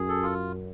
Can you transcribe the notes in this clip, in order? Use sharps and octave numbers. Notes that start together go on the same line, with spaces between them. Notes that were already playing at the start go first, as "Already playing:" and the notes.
Already playing: F#2 G#4
A4
F4